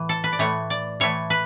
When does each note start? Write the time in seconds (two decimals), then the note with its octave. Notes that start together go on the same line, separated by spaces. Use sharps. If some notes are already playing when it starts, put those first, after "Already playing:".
Already playing: A2 E3
0.09 A4
0.24 B4
0.32 D5
0.39 A2 E3 A3 C#5
0.70 D5
1.00 A2 E3 A3 C#5
1.30 B4